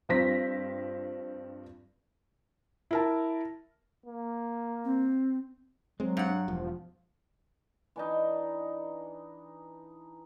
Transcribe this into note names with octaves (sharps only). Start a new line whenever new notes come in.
G2 F3 C4 A#6 B6
E4 A#4 A5
A#3
C4
F#3 G#3 C4
G2 F#5
E1 F3
E3 D4 D#4